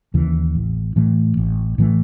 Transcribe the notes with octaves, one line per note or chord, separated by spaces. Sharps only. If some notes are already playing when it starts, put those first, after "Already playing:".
D#2 C#3 E3
A1
A2 E3 A3
A1
A2 E3 A3